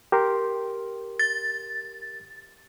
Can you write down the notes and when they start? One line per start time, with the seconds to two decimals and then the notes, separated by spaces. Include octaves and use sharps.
0.12 G4 A#4 C6
1.19 A6